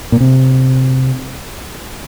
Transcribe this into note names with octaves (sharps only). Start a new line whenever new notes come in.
A#2
C3